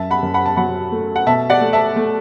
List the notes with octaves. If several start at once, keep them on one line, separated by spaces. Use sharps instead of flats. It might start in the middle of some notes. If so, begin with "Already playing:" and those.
Already playing: F#2 E5 A5
F#5 B5
F#2
F#5 B5
A5
F#3 F#5 B5
A3
F#5
B2 E5 A5
D5 F#5
A3
E5 A5
A3